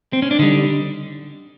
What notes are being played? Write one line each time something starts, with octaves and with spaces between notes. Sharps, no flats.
C4
C#4
D4
D3 G3 D#4